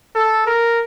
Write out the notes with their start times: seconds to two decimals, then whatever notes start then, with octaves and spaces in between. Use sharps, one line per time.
0.16 A4
0.47 A#4